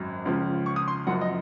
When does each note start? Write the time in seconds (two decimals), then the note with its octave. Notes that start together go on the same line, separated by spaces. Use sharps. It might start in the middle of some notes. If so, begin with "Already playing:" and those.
Already playing: G#1 F#2
0.25 C#2 C#3 F3
0.66 C#6
0.76 D#6
0.88 C6
1.07 F#1 F#2 F3 F#5
1.21 D#5